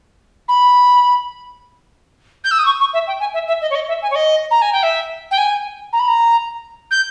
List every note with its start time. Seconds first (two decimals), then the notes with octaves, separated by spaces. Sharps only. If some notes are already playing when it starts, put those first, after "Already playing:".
0.48 B5
2.44 G6
2.51 E6
2.59 D#6
2.66 C#6
2.80 C#6
2.94 E5
3.07 G5
3.20 G#5
3.34 E5
3.48 E5
3.62 D#5
3.70 C#5
3.75 D#5
3.88 E5
4.02 G#5
4.11 C#5
4.15 D#5
4.51 A#5
4.62 G#5
4.73 G5
4.83 E5
5.31 G5
5.38 G#5
5.93 A#5
6.00 B5
6.08 A#5
6.91 G6